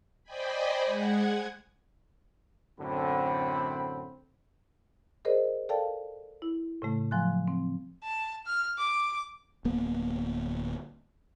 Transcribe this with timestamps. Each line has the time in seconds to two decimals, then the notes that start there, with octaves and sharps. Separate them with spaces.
0.24 C5 D5 D#5 G5 G#5 B5
0.85 G#3 F#5 G#6
2.80 F#2 A2 D3 C4 B5
5.25 G#4 A#4 C5 D5 D#5
5.69 A4 A#4 D5 F5 G5 A5
6.42 E4
6.82 A2 C#3 A3
7.11 F3 F#3 G#5 C6 F#6
7.48 C4
8.03 A5
8.46 F6
8.78 D6
9.65 D1 A#3 B3